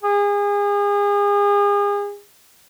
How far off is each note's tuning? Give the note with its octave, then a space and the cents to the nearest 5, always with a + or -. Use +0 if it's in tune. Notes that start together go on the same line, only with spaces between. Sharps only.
G#4 -35